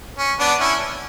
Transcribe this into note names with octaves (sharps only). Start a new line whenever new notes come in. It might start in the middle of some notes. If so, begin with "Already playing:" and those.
C#4
B3 D4
C#4 E4